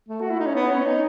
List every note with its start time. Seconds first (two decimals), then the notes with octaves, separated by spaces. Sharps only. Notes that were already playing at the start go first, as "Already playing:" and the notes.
0.09 A3
0.21 F#4
0.30 E4
0.39 D#4
0.46 C#4
0.55 B3
0.71 C#4
0.86 D#4